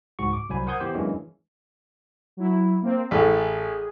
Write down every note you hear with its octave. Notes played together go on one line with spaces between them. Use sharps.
C#2 G#2 F#4 C#6
D6
C2 F#3 C5 G#5 B5
A#4 C5 F#5 D#6 G6 G#6
E3 B3 G4 C5
E3 F#3 G#3 A#3 C#4 D4
F#3 E4
A#3 C4
A1 G#4 A4